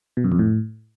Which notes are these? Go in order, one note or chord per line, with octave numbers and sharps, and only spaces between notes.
B2
F#2
F2
A2